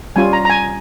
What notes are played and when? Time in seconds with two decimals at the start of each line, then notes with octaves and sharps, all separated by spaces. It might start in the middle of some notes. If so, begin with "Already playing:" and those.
0.16 G3 C#4 F4 G#5
0.33 A#5
0.45 A#5
0.50 G#5